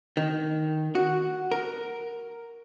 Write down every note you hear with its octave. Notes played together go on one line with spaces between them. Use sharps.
D#3
F#4
A#4